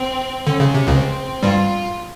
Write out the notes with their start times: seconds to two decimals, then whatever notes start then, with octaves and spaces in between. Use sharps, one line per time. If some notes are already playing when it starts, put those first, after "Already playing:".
Already playing: C4
0.47 D3 C#4
0.60 C#3
0.74 C3
0.87 C#2 C#3
0.95 C4
1.43 G2 G3 F4